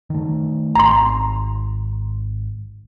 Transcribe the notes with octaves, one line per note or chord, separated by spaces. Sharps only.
D#3 A3
G#1 A#5 C6